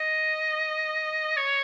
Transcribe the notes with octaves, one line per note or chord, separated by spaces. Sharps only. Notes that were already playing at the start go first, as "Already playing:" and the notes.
Already playing: D#5
C#5